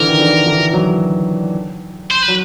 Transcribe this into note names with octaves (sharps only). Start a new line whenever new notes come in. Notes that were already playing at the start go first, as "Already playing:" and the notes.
Already playing: D3 E3 A#4
D#3
D3 E3
D3 E3
E3 F#3
C5
B4
F#3